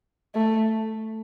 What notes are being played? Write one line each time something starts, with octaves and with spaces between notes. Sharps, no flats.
A3